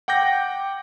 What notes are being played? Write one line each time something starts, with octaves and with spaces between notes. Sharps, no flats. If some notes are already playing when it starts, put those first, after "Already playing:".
F#5 G5 D6 G6 A#6